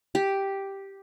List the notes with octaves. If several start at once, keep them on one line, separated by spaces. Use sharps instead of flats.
G4